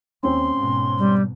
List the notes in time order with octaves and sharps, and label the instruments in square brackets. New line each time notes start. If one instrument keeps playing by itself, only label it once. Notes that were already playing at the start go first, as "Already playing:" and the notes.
[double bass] D#2 [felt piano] C4 C#4 [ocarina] C6
[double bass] G#2 B2
[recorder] G3